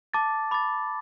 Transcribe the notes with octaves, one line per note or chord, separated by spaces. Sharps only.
A5 D6 A6
B5 D6 A6